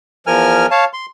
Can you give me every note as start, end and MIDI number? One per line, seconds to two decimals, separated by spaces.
0.27 0.66 40
0.27 0.66 53
0.27 0.66 70
0.27 0.66 80
0.27 0.66 89
0.71 0.85 73
0.71 0.85 77
0.71 0.85 81
0.93 1.06 84